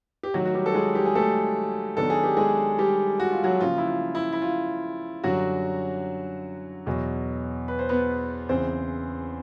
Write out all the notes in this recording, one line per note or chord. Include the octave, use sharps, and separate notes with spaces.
G4
D#3 F#3 A3 F#4
F#4
G3 G4
A4
G#3 G#4
G3 G4
G#4
A3 A4
D#3 F#3 B3 D4 A4
G#4
G4
G#3 G#4
G3 G4
F#4
F4
F#3 F#4
C#3 F3 A#3 F4
E4
F4
E4
E4
F4
F#2 D3 F#3 G3 F#4
E2 B2 F#3
B4
C5
B3 B4
E2 C#3 E3 C4 C5